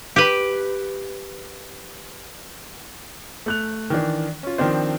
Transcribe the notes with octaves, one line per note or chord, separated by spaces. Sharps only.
G4 B4
A3 F#6 F7
D#3 E3 D4
C#4 F4
D#3 F3 C4 D4 C5